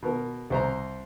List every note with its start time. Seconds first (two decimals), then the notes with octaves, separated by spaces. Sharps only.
0.02 B2 A#4
0.50 C2 C5 A#5